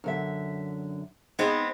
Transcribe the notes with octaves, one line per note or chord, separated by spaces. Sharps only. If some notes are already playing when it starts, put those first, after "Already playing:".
F#2 D3 E5
G#3 B3 C4 D#4